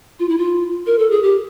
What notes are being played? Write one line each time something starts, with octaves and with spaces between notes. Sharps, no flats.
F4
E4
F4
A#4
A4
G#4
G4